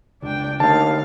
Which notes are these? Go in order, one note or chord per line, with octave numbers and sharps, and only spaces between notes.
F1 C#2 D4 G5
D#2 D3 A3 F5 A5